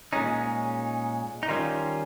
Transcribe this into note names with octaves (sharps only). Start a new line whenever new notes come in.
A#2 G#3 C#4 D#4
D#4
D#3 G3 C#4 F4